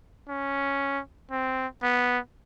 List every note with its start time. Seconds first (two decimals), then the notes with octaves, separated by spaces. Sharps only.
0.28 C#4
1.31 C4
1.83 B3